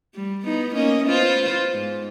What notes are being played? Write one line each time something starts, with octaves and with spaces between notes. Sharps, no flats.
G3
B3 D#4
A#3 C#4 D#5
B3 F4 C5
G#2